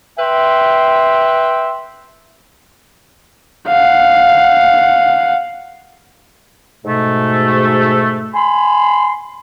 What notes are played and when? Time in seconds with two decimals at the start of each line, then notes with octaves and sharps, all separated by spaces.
0.20 B4 E5 G5 C6
3.67 F5 F#5
6.85 G#2 B2 A3
8.35 G#5 B5 C6